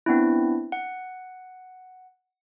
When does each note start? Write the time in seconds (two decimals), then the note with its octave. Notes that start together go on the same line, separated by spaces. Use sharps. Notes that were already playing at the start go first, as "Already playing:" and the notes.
0.06 B3 C4 D4 E4
0.72 F#5